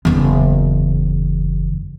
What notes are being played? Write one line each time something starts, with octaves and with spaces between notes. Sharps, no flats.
F#1 E2